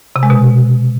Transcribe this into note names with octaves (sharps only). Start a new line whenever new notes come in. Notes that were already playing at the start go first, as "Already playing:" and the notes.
C3
G#3
B2